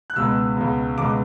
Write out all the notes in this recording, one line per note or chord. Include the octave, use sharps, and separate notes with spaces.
F#6
C#2 B2 G#3 B3 E6
C#2 B2 G#3 B3
C#2 B2 G#3 B3 D6